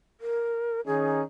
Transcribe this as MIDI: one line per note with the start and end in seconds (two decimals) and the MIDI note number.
0.21 0.80 70
0.86 1.22 51
0.86 1.22 61
0.86 1.22 63
0.86 1.20 68